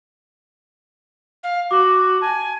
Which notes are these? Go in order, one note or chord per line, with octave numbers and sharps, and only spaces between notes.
F5
F#4 D6
G#5 A5